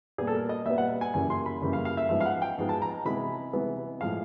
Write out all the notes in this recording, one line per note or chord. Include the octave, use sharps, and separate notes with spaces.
A#2 G3 B3 G#4
A4
A#4
D#5
A#2 G3 B3 E5
F#5
G#5
F#2 C#3 E3 G3 A#3 G#5
C6
B5
F#2 C#3 E3 G3 A#3
F5
F5
E5
G#2 F3 G#3 B3 E5
F5
F#5
G5
G#2 F3 G#3 B3
A5
A#5
C3 E3 G#3 B3 B5
C3 E3 G#3 B3
A2 F3 G#3 F5